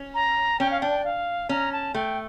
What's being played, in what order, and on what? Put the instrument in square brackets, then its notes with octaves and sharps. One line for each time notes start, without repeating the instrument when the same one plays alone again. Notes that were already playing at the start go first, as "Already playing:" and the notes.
Already playing: [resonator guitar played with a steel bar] C#4
[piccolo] A#5
[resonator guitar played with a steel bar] C#4 [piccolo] G5
[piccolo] F5
[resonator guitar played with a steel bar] D4 [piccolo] G5
[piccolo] F5
[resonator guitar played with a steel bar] C#4 [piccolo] A#5
[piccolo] A5
[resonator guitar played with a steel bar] A3 [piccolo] G5